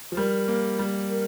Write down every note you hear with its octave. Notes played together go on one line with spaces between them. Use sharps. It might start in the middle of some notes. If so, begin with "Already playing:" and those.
F3
G3 A#4
A#3
G3
A#4